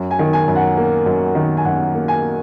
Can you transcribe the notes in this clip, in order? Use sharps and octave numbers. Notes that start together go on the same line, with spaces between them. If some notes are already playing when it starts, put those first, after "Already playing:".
Already playing: F#2
G#5
D#3
G#5
F#2
F#5
A#3
F#2
D#3
G#5
F#2 F#5
A#3
G#5